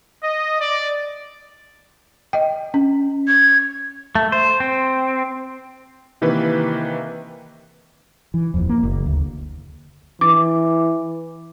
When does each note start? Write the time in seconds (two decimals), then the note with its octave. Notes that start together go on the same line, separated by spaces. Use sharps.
0.23 D#5
0.60 D5
2.33 D#5 G5
2.74 C#4
3.28 G#6
4.15 A3
4.32 C5
4.60 C4
6.21 C3 D#3 E3 A#3 B4
8.34 E3
8.54 D#1 F2
8.69 A#3
8.83 F#1
9.06 D2
10.21 E3 D6